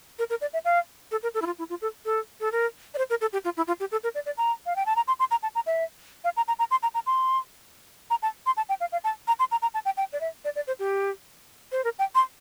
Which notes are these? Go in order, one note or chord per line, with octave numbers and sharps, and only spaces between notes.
A#4
A#4
D5
E5
F5
A4
A#4
A4
E4
F4
E4
F4
A4
A4
A4
A#4
D5
C5
A#4
A4
G4
F4
E4
F4
G4
A4
A#4
D5
D5
A#5
F5
G5
A5
A#5
C6
C6
A#5
A5
A#5
E5
F5
A#5
A#5
A#5
C6
A#5
A#5
C6
A#5
A5
C6
A5
G5
F5
F5
A5
A#5
C6
A#5
A#5
A5
G5
G5
D5
E5
D5
D5
C5
G4
C5
A#4
G5
C6